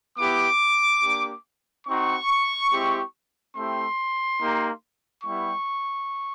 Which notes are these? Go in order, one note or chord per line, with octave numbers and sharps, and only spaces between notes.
B3 E4 G4 D6
A#3 D4 G4
C4 D#4 F#4 C#6
G#3 C4 E4 G4
A3 C4 E4 G4 C6
A#3 D#4 G4
G3 B3 E4 G4 C#6